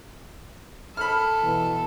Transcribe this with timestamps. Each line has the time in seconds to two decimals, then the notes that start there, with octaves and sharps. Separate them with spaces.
0.97 A4 B5 F6
1.43 B2 E3